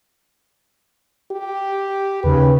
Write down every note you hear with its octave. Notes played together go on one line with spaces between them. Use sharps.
G4
D#2 C#3 B4